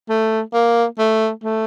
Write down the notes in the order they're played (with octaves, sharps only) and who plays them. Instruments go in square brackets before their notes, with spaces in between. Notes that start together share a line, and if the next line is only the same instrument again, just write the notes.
[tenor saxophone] A3
A#3
A3
A3